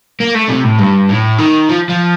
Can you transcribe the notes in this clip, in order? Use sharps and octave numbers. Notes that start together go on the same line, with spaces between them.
A#3
A3
C3
A2
G2
A2
D#3
F3
F3